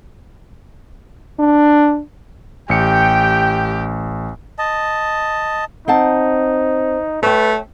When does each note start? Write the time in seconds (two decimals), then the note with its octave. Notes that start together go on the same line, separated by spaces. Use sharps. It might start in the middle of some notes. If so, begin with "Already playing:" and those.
1.39 D4
2.69 A1 G4 G5 C#7
4.58 D#5 A5
5.88 C4 D#4 F#5 A5
7.23 A3 B4 C#5 G5